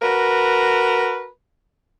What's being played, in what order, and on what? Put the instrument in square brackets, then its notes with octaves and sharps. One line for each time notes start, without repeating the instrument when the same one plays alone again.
[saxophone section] F#4 A#4 B4